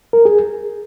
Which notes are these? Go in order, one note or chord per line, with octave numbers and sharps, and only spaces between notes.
A#4
G#4